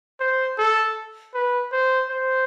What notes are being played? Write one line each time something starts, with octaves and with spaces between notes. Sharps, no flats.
C5
A4
B4
C5
C5